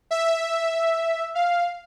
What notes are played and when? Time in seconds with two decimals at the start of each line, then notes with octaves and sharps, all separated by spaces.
0.11 E5
1.35 F5